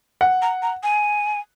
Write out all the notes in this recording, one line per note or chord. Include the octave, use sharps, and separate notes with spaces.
F#5
A#5
A#5
G#5